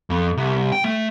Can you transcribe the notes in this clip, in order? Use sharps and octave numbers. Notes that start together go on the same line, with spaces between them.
F2
C2
G5
A3